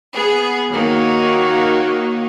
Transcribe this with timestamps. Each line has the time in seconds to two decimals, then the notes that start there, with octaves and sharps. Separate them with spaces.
0.14 B3 G#4
0.71 D#3 A#3 D#4 F#4 C#5